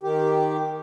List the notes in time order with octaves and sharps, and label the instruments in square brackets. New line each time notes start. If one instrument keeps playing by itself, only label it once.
[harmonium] D#3 G4